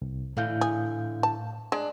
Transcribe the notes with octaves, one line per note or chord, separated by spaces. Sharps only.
C2
A2 D3 E3 F5 G6
G#4
A5
G#3 D4